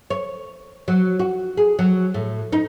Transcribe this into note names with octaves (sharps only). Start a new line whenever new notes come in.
C#5
F#3
F#4
G#4
F#3
A2
D#4